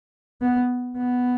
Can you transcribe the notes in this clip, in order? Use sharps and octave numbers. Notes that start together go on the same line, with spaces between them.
B3
B3